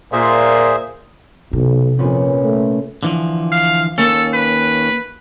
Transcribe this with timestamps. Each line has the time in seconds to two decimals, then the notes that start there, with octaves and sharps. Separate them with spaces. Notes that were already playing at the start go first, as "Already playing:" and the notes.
0.12 A#2 G#4 C5 E5
1.53 B1 C3
1.99 F2 A#2 B3 C#4
2.43 A3
3.03 D3 E3 F3
3.52 F5
3.98 D#2 A#3 C#4 A4
4.34 B4